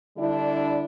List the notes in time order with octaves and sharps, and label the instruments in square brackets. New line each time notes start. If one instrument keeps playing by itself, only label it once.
[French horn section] D3 G3 D4 E4